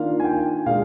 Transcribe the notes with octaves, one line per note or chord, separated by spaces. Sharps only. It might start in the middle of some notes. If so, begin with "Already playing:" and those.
Already playing: D#3 A#3 D4 F4 F5
G#5
G5
A#2 G#3 F5